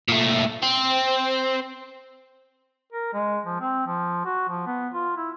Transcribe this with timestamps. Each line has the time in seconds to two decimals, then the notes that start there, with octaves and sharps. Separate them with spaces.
0.08 A#2 A3
0.63 C4
2.92 A#4
3.13 G#3
3.45 F3
3.61 C4
3.86 F3
4.25 F#4
4.49 F3
4.67 B3
4.94 F4
5.17 E4